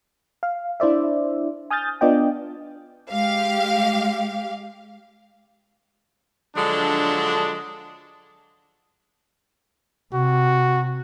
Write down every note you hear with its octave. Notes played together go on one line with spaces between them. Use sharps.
F5
D4 E4 C5 D5 E5
G#5 D#6 F6 G6 A6
B3 D4 F4 D5 D#5 G5
G#3 G4 F5
D3 F3 F#3 G#3 D4
C3 F#4